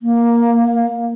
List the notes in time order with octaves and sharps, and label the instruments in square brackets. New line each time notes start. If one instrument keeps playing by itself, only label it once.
[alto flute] A#3